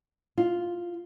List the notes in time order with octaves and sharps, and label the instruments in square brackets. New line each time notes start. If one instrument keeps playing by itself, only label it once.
[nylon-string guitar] F4